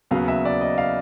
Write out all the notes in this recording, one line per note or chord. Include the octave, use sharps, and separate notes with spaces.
D#2 C#3 F#3 B3 F5
E5
D5
D#5
F5